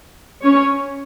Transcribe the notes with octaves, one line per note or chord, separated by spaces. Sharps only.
C#4 C#5